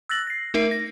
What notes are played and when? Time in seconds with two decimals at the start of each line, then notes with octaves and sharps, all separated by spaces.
0.09 E6 F#6 A6 A#6 F#7
0.27 A#6 C7
0.54 A3 D#4 A#4 E5 C7 D7
0.71 A#6